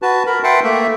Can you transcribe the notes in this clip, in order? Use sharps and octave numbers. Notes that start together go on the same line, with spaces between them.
F#4 B4 A5
A#4 B5
B4 E5 F#5 G5 A5 C6
A3 A#3 E5